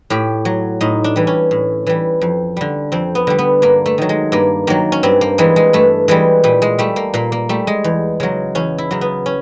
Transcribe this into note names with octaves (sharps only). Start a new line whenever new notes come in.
A2 G4
F#3
A2 D#4
D4
E3 G3
C#4
A2
E3 G3
F2
D3 G3
F2 C4
B3
D3 G3
B3
G2 A#3
A3
D#3 F#3
G#3
G2 A#3
D#3 F#3 A#3
C#4
G2 C4
A#3
E3 G3 G#3
G#3
G2 A3
E3 G3 G#3
A#2 G3
G#3
G3 A3
A#3
A#2 A#3
A#3
G3 A3
G#3
E2
C#3 F#3 G#3
E2 C#4
E4
C#3 F#3
B3
C#4